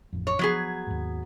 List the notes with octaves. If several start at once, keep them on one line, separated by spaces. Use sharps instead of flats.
A1 F2
C#5
F3 F#3 B3 G#4
D#2 G#2